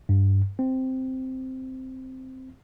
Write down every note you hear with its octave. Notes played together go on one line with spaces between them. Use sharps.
G2
C4